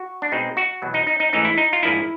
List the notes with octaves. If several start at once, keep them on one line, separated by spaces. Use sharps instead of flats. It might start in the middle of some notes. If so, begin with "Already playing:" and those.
Already playing: F#4
D4
B2 G#3 C4 D#4
F#4
E2 B2 F#3
D#4
D#4
D#4
G#2 E3 A3 C#4 D#4
E4
D#4
F4
G#2 F3 A#3 D4 E4